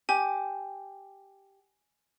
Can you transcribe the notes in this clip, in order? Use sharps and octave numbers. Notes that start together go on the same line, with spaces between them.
G4 G#5